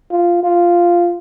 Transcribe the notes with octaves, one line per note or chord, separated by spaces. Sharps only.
F4
F4